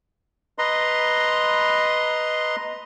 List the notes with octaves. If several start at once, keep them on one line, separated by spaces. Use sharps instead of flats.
B4 D#5 A#5 C6